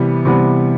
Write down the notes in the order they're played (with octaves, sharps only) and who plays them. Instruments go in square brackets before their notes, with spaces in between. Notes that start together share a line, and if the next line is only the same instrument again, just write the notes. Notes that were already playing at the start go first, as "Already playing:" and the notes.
Already playing: [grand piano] C3 E3 G3 B3
C3 E3 G3 B3